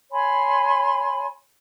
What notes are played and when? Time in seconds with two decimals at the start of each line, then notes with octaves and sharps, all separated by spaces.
0.11 C#5 G#5 B5 C6